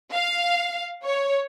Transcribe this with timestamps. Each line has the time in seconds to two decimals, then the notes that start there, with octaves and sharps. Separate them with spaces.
0.13 F5
1.03 C#5